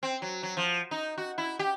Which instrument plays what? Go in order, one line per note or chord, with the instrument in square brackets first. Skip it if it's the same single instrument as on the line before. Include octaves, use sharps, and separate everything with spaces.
[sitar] C4
F#3
F#3
F3
D#4
F#4
E4
G4